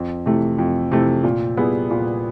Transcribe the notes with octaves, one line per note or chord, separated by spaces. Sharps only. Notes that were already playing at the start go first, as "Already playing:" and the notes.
Already playing: F2
C3 E3 A3
F2
C3 E3 A3
A#2
G3 B3 E4 G#4
A#2